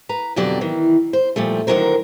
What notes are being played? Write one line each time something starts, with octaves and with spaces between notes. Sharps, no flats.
B4 A#5
F2 B2 D3 F#3 G4 D5
D#3 E3
C5
A#2 F3 G3 A3
D3 D#3 F3 F#3 A#4 C5